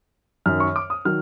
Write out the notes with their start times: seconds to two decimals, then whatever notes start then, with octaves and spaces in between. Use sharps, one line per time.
0.46 F#2 D#3 F#3 F6
0.60 C#6
0.76 D6
0.90 D#6
1.05 D#3 F#3 F6